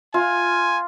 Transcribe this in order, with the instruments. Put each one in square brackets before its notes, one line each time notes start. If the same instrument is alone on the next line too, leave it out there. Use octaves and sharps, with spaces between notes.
[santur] F4 [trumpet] G#5